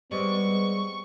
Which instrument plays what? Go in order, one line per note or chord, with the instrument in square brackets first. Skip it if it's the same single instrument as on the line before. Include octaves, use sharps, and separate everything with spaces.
[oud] G3 G#3 C4 [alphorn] B3 [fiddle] C#6